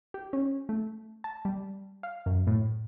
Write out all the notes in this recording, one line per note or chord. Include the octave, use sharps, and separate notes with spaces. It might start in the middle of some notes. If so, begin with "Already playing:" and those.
G4
C#4
A3
A5
G3
F5
F#2
A2